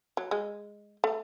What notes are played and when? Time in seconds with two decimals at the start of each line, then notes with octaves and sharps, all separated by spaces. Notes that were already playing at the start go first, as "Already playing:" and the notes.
0.17 F#3
0.31 G#3
1.04 A3